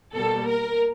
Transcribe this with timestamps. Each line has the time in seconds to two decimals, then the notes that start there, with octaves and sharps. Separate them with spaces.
0.15 B2 G3 A#3 A4
0.47 A#4